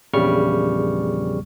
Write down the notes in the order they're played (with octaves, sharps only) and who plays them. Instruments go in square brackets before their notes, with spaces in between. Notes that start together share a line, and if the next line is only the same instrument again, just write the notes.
[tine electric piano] A#1 E2 C#3 G3 C#6 F6